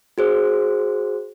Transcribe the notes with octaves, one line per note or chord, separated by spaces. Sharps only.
F#4 G#4 C5